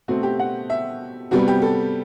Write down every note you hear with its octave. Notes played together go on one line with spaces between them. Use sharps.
B2 A3 C4 F#4
G4
F#5
E5
C3 G3 B3 F#4
G4
A4